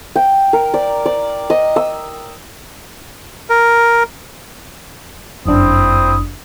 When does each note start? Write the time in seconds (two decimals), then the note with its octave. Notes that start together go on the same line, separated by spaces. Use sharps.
0.16 G5
0.53 A#4
0.74 D5
1.06 D5
1.50 D#5
1.76 E6
3.49 A#4
5.46 G1 F#2 C4 D4 E4 D#6